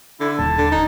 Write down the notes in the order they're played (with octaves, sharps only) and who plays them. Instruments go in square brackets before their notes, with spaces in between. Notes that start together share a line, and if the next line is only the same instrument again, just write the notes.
[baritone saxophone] D3 [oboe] E4
[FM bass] D#1 [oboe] A5
[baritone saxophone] D3
D#4